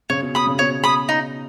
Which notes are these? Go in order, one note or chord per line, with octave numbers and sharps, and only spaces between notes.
C#3 C#5
B2
B2 B5 D#6
C#3
B2 C#5
B5 D#6
D#4